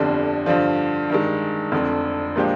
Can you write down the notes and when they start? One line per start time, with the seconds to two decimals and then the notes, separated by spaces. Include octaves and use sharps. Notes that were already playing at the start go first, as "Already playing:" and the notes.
Already playing: G1 F2 D3 G3
0.46 G2 D3 F3
1.10 G2 D#3 G#3
1.72 F1 F2 D3
2.36 A#2 F3 G#3 D4 G4